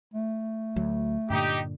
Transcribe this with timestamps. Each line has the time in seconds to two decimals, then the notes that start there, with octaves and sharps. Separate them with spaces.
0.14 A3
0.76 D2 F#3
1.30 G2 A#2 D3 D#4 G4